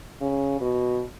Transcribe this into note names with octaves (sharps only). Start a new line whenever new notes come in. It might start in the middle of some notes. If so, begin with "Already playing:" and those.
C#3
B2